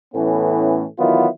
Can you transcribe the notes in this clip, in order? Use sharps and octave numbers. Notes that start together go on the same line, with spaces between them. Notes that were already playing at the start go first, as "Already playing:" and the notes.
A2 E3 A3 B3 C#4
D#3 E3 F#3 B3 E4 F4